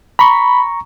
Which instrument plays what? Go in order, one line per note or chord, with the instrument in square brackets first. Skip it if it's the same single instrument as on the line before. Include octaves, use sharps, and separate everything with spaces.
[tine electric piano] A#5 C#6 [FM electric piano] B5